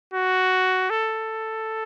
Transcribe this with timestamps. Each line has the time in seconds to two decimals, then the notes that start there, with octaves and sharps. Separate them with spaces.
0.14 F#4
0.90 A4